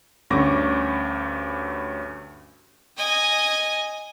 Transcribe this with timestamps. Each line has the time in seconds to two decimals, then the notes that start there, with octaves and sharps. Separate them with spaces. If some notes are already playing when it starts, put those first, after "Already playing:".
0.30 D2 G2 C#4 C#6 D6 A#6
2.98 D#5 G#5